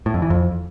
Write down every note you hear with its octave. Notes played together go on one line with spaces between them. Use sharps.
A2
F2
E3
F2